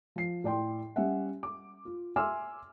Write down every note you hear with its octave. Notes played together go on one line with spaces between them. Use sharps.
F3 C7
A2 D5 G5 C6
G3 C#4 E5 F#5
D6
F4
E5 G#5 C6 D6 E6 F6